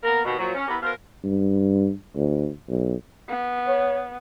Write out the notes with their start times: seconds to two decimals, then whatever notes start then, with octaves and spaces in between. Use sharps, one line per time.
0.03 A#3 B3 A#4
0.25 D#2 B2
0.39 A#2 F3 F#3
0.55 C#4
0.68 B3 E4 G4 A#4 B4
0.82 B2 A#4 C5 F5
1.24 G2
2.16 D2
2.69 B1
3.29 B3
3.68 C#5